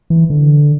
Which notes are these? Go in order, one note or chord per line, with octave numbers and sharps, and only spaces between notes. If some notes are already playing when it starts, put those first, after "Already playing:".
E3
D3